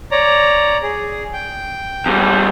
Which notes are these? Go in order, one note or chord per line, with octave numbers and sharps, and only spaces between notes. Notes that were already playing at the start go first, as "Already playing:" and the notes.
C#5 D5 A#5
G#4
G5
E2 G3